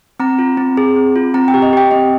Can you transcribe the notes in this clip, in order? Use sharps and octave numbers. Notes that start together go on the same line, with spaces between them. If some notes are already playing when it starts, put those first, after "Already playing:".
C4 A#5
F4
C4
G#4
C4
F4
C4 A#5
G5
G4
D#5
G4 G5
C4 D#5